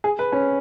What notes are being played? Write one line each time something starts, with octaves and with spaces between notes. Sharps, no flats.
G#4
B4
C#4